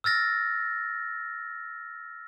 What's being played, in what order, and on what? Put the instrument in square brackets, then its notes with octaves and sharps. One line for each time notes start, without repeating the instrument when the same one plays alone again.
[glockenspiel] E6 F6 A6 A#6